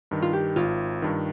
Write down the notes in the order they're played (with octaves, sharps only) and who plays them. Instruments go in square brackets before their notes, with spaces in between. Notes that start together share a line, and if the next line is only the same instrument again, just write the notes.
[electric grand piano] G2 D#3
[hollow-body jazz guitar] F4
G4
[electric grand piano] G#1 [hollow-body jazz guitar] F4
[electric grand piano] G2 D#3